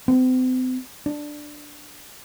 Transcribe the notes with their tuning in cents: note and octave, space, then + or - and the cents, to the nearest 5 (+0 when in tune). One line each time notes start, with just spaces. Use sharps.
C4 -40
D4 +5